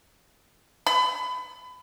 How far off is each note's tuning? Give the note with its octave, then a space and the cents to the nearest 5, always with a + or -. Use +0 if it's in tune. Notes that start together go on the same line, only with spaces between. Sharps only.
B5 +25